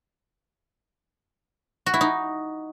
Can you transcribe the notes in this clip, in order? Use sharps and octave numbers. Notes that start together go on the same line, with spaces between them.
F#4
E4
D#4